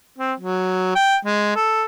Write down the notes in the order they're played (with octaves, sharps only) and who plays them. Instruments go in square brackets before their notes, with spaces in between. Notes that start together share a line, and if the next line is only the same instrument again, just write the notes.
[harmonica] C4
F#3
G5
G#3
A4